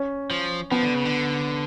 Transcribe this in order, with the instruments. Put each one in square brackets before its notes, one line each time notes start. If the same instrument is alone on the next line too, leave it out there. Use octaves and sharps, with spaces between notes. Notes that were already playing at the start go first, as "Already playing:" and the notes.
Already playing: [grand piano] C#4
[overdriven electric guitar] F3
[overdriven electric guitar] F3 [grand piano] B3
[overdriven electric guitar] D3
C#3
D3